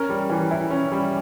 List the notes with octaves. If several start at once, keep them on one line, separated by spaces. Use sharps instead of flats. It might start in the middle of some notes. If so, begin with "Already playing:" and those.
Already playing: C#4 A#4
G3
E3
E4
C#4
G3